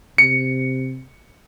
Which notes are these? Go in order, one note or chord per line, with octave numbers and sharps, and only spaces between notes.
C3 C#7